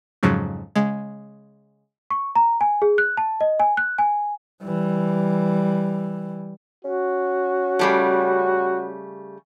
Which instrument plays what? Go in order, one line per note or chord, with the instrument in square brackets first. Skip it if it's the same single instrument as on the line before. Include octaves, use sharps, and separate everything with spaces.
[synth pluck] F2 G#2 C#3 F3 F#3
C#3 G#3
[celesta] C#6
A#5
G#5
G#4
F#6
A5
D#5
G#5
F#6
G#5
[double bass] E3 G3
[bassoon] C#4 [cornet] F#4
[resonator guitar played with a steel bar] C#3 G3 A3